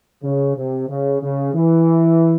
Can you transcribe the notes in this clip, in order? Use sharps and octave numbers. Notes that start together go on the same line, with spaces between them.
C#3
C3
C#3
C#3
E3